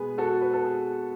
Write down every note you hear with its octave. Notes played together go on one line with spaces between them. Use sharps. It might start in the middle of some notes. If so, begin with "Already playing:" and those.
Already playing: B2 G#3 B3 G#4 B4
F#4 A4
B4
A4
G#4